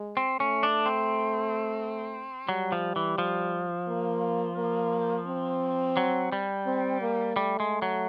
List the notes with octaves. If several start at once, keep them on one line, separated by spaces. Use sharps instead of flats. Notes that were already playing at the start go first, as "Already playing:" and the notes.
Already playing: G#3
C4
A3 C#4
D4
C4
F#3 G3
F3
E3
F3
A#3
A#3
C4
F#3
G3
C4
A#3
G3 A3
G#3
F#3